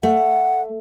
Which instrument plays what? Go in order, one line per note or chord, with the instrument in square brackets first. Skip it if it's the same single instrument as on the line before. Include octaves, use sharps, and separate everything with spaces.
[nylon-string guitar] A3 [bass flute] F#5